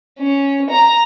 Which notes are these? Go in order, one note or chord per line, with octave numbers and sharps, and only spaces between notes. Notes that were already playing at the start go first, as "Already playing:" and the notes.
C#4
A#5